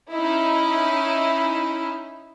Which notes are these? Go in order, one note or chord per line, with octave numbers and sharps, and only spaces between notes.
C#4 D#4 E4